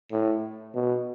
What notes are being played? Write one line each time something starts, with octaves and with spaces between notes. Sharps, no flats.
A2
B2